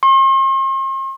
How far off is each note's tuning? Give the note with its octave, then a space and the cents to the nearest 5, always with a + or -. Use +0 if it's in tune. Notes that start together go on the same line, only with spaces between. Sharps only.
C6 +45